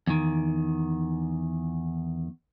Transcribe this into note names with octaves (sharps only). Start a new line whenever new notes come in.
E2 D#3